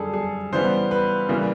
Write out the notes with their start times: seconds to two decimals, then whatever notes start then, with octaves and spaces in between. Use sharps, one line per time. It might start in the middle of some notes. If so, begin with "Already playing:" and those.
Already playing: F#2 D3 G3 G#4 A4
0.14 G#4
0.52 C#3 E3 G3 B3 C5
0.91 B4
1.29 C#3 E3 G3 A#3